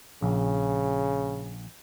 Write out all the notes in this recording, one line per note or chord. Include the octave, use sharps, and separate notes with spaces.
A#1 C#3